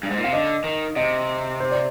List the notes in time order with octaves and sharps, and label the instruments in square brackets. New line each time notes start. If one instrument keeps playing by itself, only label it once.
[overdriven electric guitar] G2
G#2
A#2
[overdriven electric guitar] C3 [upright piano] F5
[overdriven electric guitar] D3 [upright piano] D#5
[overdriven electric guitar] D#3
[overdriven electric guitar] C3 [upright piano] D#5
[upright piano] C5
D5